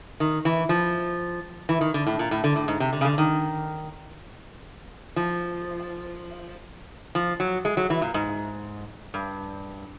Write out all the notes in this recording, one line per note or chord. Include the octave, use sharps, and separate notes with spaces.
D#3
E3
F3
E3
D#3
D3
A2
A#2
A2
D3
A2
G#2
C3
D3
C#3
D3
D#3
F3
F3
F#3
G#3
F#3
E3
A#2
G#2
G2